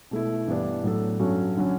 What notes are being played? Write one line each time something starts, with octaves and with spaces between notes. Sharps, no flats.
B2 A3 E4
G2 E3 G3 B3 D4
A2 F#3 B3 D4 A4
G2 F#3 C#4 F#4 A4
D3 F#3 C#4